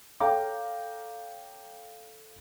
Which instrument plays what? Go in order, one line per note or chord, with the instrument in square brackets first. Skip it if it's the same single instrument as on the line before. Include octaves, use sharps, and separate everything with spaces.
[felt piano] A4 C#5 F5 G5 A#5 D6